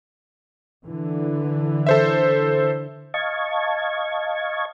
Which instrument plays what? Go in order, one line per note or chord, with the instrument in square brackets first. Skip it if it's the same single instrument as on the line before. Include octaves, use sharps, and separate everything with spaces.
[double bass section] D3 E3
[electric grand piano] A4 C5 E5
[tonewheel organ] D#5 F5 A5 C#6 G#6